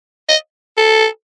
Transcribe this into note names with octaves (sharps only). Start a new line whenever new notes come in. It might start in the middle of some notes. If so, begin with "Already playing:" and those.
D#5
A4